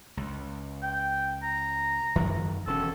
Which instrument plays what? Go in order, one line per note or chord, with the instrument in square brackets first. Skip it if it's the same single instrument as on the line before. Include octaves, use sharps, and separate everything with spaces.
[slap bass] C#2
[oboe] G5
A#5
[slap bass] F#2 D#3 F3
[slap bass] E1 C#4 [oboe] A4